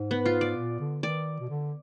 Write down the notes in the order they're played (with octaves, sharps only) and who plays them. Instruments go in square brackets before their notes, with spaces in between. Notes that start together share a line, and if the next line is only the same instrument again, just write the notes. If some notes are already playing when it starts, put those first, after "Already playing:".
Already playing: [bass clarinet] G#2
[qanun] B3
F4
D5
[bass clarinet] A#2
D3
[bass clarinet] D#3 [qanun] D5
[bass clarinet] B2
D3